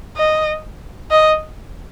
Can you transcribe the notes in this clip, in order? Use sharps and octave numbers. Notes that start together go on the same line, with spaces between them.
D#5
D#5